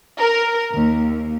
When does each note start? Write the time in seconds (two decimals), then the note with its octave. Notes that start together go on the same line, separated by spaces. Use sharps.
0.21 A#4
0.73 D#2